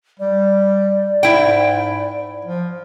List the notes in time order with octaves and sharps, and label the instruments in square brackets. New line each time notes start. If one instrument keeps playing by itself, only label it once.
[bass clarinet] G3 [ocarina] D5
[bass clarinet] G#2 [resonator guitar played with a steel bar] E4 G5
[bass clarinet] F3